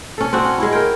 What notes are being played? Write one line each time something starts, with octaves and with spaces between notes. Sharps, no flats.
C#4 A4
C4 D4 F#4
C#4
G#3 C#4 E4
A#4 G5